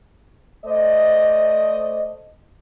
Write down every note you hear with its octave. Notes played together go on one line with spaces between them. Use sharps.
A3 C5 D5 D#5